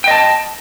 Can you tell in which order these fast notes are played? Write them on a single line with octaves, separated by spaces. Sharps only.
G5 D#5 A5